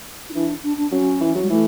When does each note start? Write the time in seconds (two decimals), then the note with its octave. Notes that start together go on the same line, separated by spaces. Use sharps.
0.29 E4
0.34 E3 D4
0.63 D4
0.77 D4
0.92 F#3 C#4
1.21 E3
1.35 F#3
1.43 G3
1.50 E3 A3